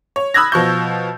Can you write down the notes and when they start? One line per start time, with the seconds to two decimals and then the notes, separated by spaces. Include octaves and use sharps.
0.16 C#5
0.34 B5 D#6 E6 F#6 G#6 A#6
0.52 B2 F3 C#6 G6